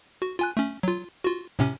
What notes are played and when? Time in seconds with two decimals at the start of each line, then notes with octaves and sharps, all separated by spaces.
0.22 F#4
0.39 F4 G#5 F#6
0.57 A3 C#4
0.83 F#3 F4
1.24 F4 F#4
1.59 A2 C3 C#4